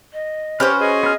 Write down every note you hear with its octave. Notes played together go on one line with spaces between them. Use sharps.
D#5
C#4 F#4 G4 B4 C5 F6
G#4 D#5
B3 F6